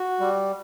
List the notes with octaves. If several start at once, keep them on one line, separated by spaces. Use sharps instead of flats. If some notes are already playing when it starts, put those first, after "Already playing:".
Already playing: F#4
G3